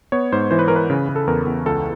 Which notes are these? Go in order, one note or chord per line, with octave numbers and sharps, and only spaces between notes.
B3 C#5
G#2 C5
E3 C5
B4
E3 A#4
B4
C#3
C#3
A4
E2 A#4
E2
C#2 A4